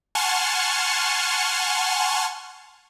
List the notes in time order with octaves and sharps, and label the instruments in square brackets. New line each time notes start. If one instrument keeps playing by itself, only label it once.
[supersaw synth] F#5 G#5 A5 C6 C#6 F6